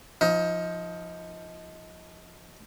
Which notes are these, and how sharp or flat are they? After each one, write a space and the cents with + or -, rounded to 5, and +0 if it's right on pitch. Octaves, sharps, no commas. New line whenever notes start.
F3 +0 D#4 +25